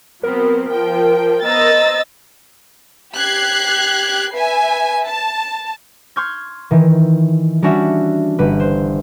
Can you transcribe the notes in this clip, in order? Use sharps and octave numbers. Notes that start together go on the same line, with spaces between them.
F#3 B3 C4 A#4
F3 G5
B3 C5 D#5 A#5 E6 A6
G4 F#6 G#6 C7
B4 E5 G#5
A5
C6 C#6 F6 G6 G#6
D#3 E3
G3 C#4 D4 F#4 D5 E5
G1 G3 B4
C5